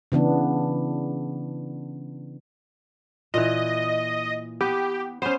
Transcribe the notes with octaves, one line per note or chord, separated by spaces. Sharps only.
C#3 E3 B3 D4
A#2 E3 D#5
B3 G4
B3 C#4 C5